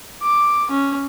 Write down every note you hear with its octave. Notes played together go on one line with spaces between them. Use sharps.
D6
C#4